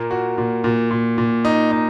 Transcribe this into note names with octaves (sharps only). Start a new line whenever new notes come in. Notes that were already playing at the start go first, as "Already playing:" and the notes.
Already playing: A#2 A#3
F#4
A#2
A#2
A#2
A#2
D#4
D#4